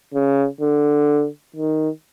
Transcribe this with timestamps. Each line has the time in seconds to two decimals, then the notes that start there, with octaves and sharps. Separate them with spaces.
0.14 C#3
0.61 D3
1.56 D#3